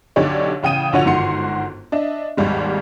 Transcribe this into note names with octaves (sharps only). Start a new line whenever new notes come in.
B1 D3 D#4 G4 C#5 D5
A1 C#3 G5 D#6 D#7
A#1 D3 F#4 C#5 F#5 F7
G1 G#2 D#3 F#4 C6 C#7
D4 D#5 E5
G#1 D#2 G3 G#3